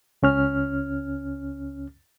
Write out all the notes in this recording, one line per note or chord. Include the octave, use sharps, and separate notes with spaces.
C#2 C#4 F6